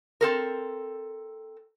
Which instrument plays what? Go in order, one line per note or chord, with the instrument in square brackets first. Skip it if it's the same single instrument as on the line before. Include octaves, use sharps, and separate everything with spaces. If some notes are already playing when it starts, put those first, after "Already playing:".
[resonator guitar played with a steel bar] C4 A4 A#4